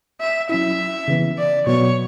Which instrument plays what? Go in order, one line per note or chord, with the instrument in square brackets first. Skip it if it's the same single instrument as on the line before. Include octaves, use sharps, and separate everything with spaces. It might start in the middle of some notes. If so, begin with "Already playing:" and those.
[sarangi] E5
[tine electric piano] F#3 C#4 E4 [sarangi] E5
[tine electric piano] C#3 E3 B3
[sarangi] D5
[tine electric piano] B2 F#3 B3 [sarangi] C#5